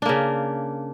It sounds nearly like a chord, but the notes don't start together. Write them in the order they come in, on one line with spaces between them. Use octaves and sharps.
D4 A#3 C#3